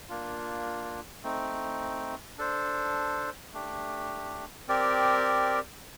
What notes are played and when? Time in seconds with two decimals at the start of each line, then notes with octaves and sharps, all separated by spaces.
0.08 A#3 D4 F4
1.23 A3 C4 D#4
2.38 D4 A4 C5
3.53 A3 D4 G4
4.68 C4 G4 A#4 D5